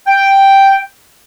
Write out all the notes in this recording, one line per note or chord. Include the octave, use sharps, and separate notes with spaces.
G5